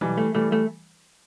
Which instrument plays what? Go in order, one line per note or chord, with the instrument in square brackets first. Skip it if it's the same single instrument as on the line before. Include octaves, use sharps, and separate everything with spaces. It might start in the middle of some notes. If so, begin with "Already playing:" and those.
[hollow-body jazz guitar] B1 [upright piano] E3 G3
[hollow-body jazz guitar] A3
[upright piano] E3 G3 [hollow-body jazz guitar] A3
[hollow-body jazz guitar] A3